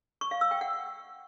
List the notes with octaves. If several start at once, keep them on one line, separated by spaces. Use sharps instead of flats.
C#6
F5
E6
G5
F#5